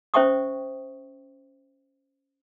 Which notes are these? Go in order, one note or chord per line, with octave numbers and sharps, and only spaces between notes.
C#4 C5 E5 G5 C#6 D#6